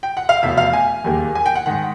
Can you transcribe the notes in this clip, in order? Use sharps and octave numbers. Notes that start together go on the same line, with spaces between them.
G5
F#5
F5
F1 E2 B2 E5
F5
G#5
E1 D#2 D#3 G3 A#3
G#5
G5
F#5
G#2 D#3 F#5